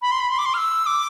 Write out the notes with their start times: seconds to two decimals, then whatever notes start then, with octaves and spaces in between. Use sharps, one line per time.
0.02 B5
0.11 C6
0.20 B5
0.30 C6
0.38 D6
0.45 C6
0.54 F6
0.58 E6
0.86 D6